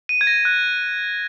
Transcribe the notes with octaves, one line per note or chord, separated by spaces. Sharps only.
D#7
G#6
A#6
F#6